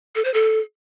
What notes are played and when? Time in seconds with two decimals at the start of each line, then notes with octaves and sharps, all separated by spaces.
0.15 A4
0.25 C5
0.34 A4